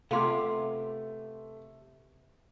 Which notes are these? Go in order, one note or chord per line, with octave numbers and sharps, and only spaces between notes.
C3 A3 B3 C4 F4 F5 C6 D6